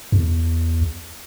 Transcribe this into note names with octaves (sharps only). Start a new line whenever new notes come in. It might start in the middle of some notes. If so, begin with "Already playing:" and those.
E2